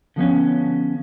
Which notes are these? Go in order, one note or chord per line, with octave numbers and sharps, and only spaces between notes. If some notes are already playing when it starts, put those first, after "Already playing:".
D3 F3 B3 C#4